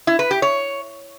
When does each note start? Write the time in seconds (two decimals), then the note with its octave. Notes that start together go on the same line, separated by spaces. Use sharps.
0.07 E4
0.19 B4
0.31 G4
0.42 C#5